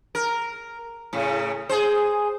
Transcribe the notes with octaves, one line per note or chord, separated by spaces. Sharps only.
A#4
A2 C#3
G#4 C5